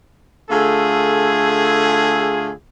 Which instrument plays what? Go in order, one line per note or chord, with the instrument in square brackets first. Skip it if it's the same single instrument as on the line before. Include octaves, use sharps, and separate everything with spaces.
[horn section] D3 A3 F4 G#4